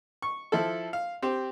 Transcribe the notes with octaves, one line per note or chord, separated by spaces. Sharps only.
C#6
F3 E4 A4
F5
C4 G4